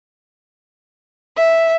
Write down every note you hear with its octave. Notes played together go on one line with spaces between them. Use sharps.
E5